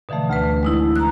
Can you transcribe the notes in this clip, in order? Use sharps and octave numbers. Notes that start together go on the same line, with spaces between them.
B2 D3 E3 F3 A3
D2 A3 B4
G#3 D#4 E4
A#5 F#6